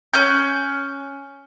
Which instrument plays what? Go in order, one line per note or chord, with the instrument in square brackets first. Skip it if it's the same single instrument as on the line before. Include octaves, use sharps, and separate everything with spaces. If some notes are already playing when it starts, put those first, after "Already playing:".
[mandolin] C#4 F#6 G6